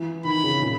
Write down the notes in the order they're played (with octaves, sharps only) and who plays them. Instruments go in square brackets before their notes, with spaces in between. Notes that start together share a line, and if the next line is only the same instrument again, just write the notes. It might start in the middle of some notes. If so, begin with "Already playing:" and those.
Already playing: [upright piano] E3
[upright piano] D#3 [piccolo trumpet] B5
[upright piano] C#3
A#2